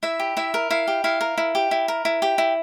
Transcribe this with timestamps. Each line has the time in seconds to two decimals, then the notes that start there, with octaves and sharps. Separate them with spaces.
0.03 E4 E5
0.20 G4
0.37 E4 E5
0.54 A#4
0.70 E4 F5
0.87 G4
1.04 E4 F5
1.21 A#4
1.38 E4
1.55 G4
1.71 E4
1.88 A#4
2.05 E4
2.22 G4
2.38 E4